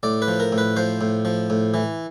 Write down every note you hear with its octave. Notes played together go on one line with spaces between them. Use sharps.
A2 D5
B4
F3
A#4
A2
B4
F3 C5
A2
F3
A2
E3